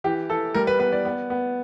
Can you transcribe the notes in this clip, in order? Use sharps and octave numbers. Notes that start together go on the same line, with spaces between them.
E3 G4
E3 A4
G3 A#4
B4
B3 B4
D5
B3
B3